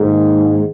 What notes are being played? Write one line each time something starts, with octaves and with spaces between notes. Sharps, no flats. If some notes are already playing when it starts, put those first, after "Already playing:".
Already playing: G#2 D#3 A#3 D#4 G#4